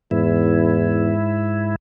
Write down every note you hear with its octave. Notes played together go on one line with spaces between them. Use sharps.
E2 G#2 E4